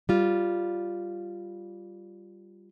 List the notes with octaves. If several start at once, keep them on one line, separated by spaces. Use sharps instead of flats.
G3 F4